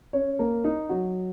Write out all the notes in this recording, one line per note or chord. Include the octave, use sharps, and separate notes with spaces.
C#4 C#5
A#3 A#4
D#4
F#3 F#4